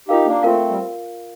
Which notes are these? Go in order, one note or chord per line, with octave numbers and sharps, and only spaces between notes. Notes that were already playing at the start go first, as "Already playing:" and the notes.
D#4 F4 G4 A#4 F5
A#3 D4
A3 C4 F4 A#4 F5
G3